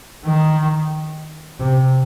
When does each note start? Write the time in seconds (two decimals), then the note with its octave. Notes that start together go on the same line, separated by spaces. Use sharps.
0.25 D#3
1.59 C3